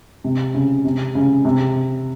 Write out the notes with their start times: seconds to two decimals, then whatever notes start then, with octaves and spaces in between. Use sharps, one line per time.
0.24 C3
0.55 C#3
0.85 C3
1.15 C#3
1.45 C3